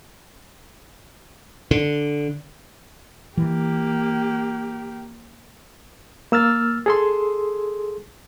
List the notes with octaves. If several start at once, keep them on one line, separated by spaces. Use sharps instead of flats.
D3
E3 A#3 G4
A#3 E6 F6 A6
G#4 A4 C6